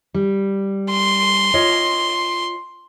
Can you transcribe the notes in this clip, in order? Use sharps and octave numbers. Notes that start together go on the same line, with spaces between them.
G3
C6
F4 C#5 D#5